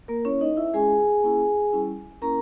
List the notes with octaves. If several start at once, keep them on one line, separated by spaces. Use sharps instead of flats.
A#3 A#4
A#3 C#4 E4 C#5
D#4 D#5
E4 E5
G#3 C#4 E4 G#4 G#5
A#3 C#4 E4
G3 C#4 E4
A#3 C#4 E4 A#4 A#5